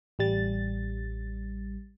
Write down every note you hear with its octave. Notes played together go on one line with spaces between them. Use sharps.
A1 G3 A6